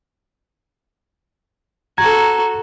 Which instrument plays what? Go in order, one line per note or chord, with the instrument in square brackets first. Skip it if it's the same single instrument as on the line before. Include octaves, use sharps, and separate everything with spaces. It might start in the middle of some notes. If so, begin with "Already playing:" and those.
[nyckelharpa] F#4 A4 [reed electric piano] A#5 G#6